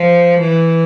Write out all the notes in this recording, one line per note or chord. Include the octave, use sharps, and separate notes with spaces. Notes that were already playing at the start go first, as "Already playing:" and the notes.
Already playing: F3
E3